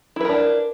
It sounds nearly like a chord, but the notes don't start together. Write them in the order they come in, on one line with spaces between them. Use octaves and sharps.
E4 B4 A#4 D4